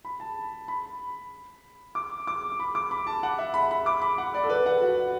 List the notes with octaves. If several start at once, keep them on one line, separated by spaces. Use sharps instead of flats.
B5
A5
B5
D6
D6
B5
D6
B5
A5
F#5
E5
B5
B5
D6
B5
F#5
D5
A4
B4
F#5
F#4